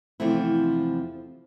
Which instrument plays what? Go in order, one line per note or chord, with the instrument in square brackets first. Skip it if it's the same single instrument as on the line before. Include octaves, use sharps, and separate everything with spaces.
[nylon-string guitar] E2 C3 F3 A3 C4 E4